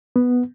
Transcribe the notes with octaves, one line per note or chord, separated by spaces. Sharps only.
B3